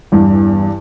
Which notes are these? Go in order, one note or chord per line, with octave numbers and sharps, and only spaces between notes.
E2 G2